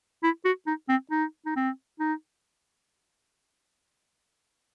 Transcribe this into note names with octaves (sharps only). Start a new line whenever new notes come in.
E4
F#4
D#4
C4
D#4
D#4
C4
D#4